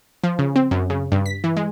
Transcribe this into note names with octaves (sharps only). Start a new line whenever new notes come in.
F3
C#3
C4
F#2
C#3
G2
B6
E3
G#3